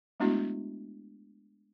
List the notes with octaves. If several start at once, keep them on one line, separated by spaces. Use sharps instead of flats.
G#3 A3 B3 D4 E4 F#4